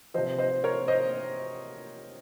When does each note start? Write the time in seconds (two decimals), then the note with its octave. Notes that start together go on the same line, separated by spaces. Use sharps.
0.14 C3 F3 C5 D#5
0.38 C5 D#5
0.64 A#4 C#5
0.88 C5 D#5